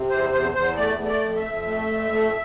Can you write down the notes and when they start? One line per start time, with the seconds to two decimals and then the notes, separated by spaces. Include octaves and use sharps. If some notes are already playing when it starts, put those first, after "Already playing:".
Already playing: C3
0.10 E2 C5
0.32 E2 C5
0.54 E2 C5
0.76 A3 D5
0.98 A3
1.06 D5
1.20 F2
1.35 E5
1.43 F2
1.65 A3
1.87 F2
2.10 A3